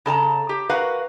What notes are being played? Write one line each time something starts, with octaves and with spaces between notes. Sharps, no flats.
C#3 A4 A5 A#5
G4
F#4 A#4 B4 F5